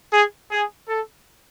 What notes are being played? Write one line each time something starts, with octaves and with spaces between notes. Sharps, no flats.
G#4
G#4
A4